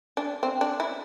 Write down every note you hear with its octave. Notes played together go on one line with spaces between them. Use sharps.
D4
C4
D4
E4